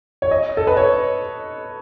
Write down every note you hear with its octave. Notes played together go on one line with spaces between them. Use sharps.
C#5
D#5
A4
B4
C#5